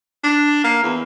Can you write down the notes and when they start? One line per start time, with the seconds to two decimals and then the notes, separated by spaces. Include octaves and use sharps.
0.24 D4
0.64 A#3
0.83 E2